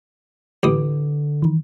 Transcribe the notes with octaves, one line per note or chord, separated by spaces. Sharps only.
A1 D3 B4 D6 D#6
D#3 E3